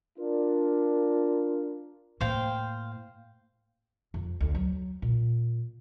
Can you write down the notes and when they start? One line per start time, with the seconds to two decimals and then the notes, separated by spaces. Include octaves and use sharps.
0.19 D4 F4 A#4
2.21 A2 A#3 C5 F5 G5
4.14 F2
4.40 D2
4.55 F#3
5.02 A#2